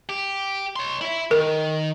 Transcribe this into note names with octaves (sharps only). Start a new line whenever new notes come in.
G4
C#5 C6
E4 E5
D#3 A#4